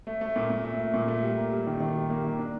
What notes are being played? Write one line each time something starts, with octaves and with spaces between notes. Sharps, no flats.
A3
A3
A#2
A#2
A3
A3
A#2
A3
G3
A#3
G3
D#3
D#3
G3
A#3
D#3
D4